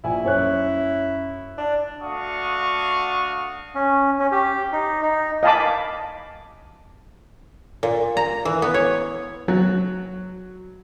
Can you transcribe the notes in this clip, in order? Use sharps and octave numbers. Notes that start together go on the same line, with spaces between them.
A#1 E4 G#5
F#2 C#5 F#6
D4
A3 D4 F#4 F5 C#6 D#6
C#4
C#4
G4
D#4
D#4
D#5 F5 G#5 A5 B5 D6
A#2
A#5
E3
B3
C#5
F#3